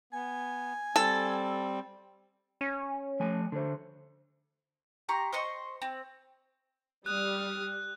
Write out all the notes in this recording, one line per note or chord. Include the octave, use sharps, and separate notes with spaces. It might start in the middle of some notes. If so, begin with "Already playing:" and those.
B3 G#5
G3 C4 A4
C#4
F3 A3 G#5
D3 C5
G4 A#5 C6 C#6
C5 D#5 C6 C#6
C4
G3 D#6 F6 F#6